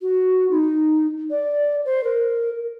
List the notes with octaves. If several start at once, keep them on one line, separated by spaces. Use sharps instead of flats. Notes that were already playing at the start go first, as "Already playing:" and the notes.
F#4
D#4
D5
C5
A#4